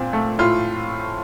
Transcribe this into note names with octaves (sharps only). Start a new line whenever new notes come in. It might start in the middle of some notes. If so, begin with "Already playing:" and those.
Already playing: A#2 C4
A3
A2 F4